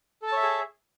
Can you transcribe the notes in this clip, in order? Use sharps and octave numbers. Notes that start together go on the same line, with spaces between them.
G#4 A4 C#5 E5 A5